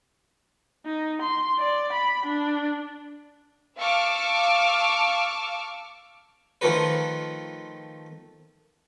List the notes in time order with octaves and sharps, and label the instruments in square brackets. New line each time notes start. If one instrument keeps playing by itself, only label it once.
[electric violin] D#4
C6
D5
B5
D4
[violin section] F5 A5 C#6 D6 E6 F6
[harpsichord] D#3 F3 A3 F4 A#4 B4